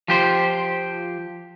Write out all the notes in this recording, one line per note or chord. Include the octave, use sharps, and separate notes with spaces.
F3 G4 C5